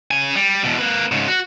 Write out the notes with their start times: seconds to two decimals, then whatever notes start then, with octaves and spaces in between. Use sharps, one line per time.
0.11 C#3 G#5
0.36 G3
0.64 E2 B2
0.78 A#3 B4
1.12 G#2 C#3
1.28 F#4